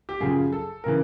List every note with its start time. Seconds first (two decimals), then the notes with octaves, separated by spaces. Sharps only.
0.09 G4
0.20 F#2 C#3 F3 G#4
0.52 A4
0.84 C#3 E3 A#4